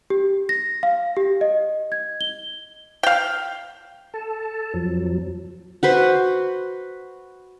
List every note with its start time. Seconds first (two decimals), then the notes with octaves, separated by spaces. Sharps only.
0.10 G4
0.49 A#6
0.83 F5
1.17 G4
1.41 D#5
1.92 G#6
2.21 G7
3.03 F5 G5
4.14 A4 A5
4.74 F2 F3 F#3
5.83 F#4 B4 C5